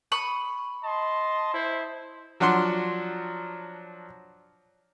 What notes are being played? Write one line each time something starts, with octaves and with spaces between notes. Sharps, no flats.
B5 C#6 D#6
D#5 A5 C6
E4 C5
F3 F#3 D4 D5 F#5 C6